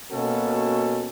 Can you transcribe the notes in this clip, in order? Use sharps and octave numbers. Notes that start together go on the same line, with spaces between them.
B2 A#3 C#4 F#4 A4